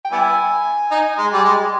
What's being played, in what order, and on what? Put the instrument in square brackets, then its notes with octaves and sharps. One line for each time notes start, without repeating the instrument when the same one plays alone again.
[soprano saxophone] G5
[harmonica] G3 B3 E4 [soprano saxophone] G#5
[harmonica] D#4
G#3
G3
G#3